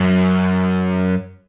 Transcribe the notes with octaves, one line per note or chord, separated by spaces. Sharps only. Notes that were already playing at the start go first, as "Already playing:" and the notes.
Already playing: F#2